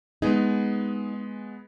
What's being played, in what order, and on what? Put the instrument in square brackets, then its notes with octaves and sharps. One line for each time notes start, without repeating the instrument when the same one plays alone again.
[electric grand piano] G#3 B3 G#4 [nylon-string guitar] D#4